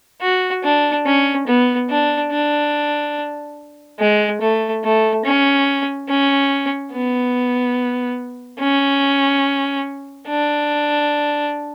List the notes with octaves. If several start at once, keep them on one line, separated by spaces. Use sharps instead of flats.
F#4
D4
C#4
B3
D4
D4
G#3
A3
A3
C#4
C#4
B3
C#4
D4